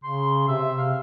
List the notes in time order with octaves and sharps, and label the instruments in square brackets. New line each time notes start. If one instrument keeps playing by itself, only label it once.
[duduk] C#3 [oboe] C6
[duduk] C3 [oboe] E5
[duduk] C3 [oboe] F5